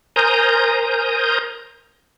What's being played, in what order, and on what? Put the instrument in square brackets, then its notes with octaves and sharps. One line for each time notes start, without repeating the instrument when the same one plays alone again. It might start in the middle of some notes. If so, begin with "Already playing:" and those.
[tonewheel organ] A#4 C5 G#5 A#5 D#6 G6